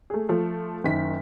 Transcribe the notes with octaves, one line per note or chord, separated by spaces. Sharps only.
A3 G#4
F3 A3
F#1 D#3 B6